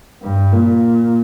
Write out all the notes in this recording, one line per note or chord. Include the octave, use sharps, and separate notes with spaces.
G2
A#2